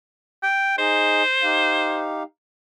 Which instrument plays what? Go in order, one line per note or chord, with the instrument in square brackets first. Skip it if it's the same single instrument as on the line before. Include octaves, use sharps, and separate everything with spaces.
[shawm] G5
[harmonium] D#4 G#4 D#5 [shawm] C5
[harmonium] D#4 G4 F5